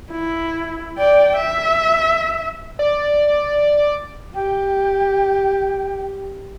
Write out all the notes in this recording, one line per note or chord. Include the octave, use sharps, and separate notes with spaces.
E4
D5 G5
E5
D5
G4 G5